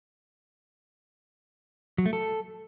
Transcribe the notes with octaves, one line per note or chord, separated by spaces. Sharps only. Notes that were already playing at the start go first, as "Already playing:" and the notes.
F#3
A3
A4